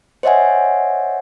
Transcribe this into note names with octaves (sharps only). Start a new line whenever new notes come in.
C5 C#5 D#5 E5 F#5 G#5